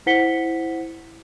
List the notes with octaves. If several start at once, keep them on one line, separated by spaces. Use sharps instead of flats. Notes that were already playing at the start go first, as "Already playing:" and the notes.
E4 C5 F#5 B6 C#7 G7